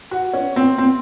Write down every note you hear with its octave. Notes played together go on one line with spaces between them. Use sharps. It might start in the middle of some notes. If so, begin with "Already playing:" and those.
F#4
C#4
C4
C4